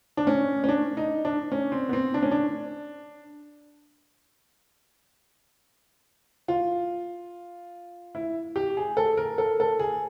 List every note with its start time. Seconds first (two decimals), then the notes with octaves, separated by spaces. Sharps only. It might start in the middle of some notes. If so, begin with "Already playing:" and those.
0.17 D4
0.27 C#4
0.64 C#4
0.69 D4
0.97 D#4
1.25 D4
1.52 C#4
1.72 C4
1.89 B3
1.93 C4
2.14 D4
2.22 C#4
2.31 D4
6.48 F4
8.15 E4
8.56 G4
8.77 G#4
8.97 A4
9.17 A#4
9.38 A4
9.60 A4
9.79 G#4